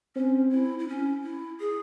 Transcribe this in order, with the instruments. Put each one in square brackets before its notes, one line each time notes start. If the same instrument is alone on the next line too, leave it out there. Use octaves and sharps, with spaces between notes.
[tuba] C4 [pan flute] C#4
[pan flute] E4
E4
C#4
E4
G#4